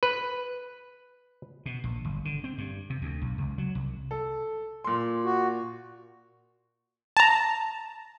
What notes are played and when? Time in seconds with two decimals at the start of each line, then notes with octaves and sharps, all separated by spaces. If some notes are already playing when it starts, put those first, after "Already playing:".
0.03 B4
1.66 B2
1.84 A#1
2.05 G1
2.25 D3
2.44 C4
2.58 G2
2.90 C3
3.02 D2
3.22 B1
3.38 C#2
3.58 F#3
3.75 C2
4.11 A4
4.84 A#2 C6
5.25 F#4
7.17 A5 A#5